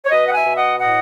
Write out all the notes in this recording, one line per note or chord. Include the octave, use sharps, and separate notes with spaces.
C#5
B2 B4 D#5
F#5
E5 G#5
B2
D#5 F#5
A2 D#5 F#5